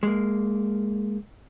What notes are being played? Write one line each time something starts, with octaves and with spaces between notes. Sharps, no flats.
G#3 A#3